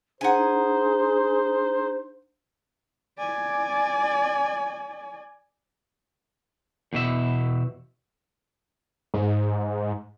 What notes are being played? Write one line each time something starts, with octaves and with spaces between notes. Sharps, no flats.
D4 D#4 G#4 C5 F#5 G#5 A#5
D5 G#5
E2 B2 E5
G#2